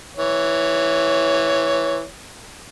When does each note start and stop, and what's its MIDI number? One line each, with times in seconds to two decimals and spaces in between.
0.17 2.05 52
0.17 2.05 73